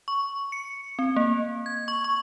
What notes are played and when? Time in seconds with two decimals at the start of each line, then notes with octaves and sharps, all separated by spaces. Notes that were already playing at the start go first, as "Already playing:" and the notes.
0.08 C#6
0.52 C#7
0.99 C4
1.16 A#3
1.66 G#6
1.88 C#6
2.04 C#6